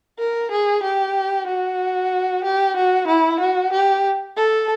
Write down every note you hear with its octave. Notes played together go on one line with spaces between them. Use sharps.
A#4
G#4
G4
F#4
G4
F#4
E4
F#4
G4
A4